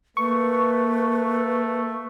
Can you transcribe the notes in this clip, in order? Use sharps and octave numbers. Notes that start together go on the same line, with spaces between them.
A3 A#3 B4 C#6